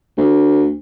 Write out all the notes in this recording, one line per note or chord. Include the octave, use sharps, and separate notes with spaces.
D2